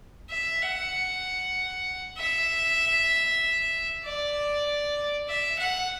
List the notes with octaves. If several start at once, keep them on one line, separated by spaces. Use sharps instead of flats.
E5
F#5
E5
D5
E5
F#5